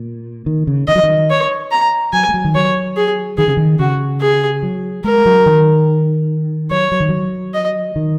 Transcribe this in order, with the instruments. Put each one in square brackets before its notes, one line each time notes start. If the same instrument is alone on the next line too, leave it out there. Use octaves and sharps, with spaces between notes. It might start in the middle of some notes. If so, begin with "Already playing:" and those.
Already playing: [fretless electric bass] A#2
D#3
C#3
[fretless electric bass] D#3 [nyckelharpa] D#5
[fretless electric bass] F#3
D#3
[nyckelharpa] C#5
A#5
[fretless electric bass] F#3 [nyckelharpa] G#5
[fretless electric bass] G#3
F#3
D#3
[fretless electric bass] F#3 [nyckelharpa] C#5
[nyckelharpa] G#4
[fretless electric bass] D#3 [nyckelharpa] G#4
[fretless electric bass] C#3
D#3
[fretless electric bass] C#3 [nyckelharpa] F#4
[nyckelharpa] G#4
[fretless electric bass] F#3
[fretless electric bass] G#3 [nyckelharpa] A#4
[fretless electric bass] F#3
D#3
[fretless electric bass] F#3 [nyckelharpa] C#5
[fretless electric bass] F#3
D#3
F#3
[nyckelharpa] D#5
[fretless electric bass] D#3